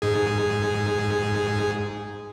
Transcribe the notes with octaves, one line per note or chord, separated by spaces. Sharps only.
G#2 G#4